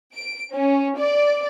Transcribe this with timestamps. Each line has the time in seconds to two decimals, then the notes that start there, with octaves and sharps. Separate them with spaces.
0.13 D7
0.54 C#4
0.98 D5